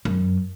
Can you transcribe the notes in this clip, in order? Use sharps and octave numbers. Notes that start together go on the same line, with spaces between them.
F#2